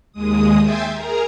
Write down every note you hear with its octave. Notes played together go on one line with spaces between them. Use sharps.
D#2 G#3 D#6
E5 G5 G#5 C6 G6 A6
G#4 A#4 A#5